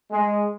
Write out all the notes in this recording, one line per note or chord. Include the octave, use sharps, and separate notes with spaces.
G#3